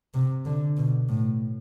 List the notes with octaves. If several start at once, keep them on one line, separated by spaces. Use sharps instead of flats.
C3
D3
B2
A2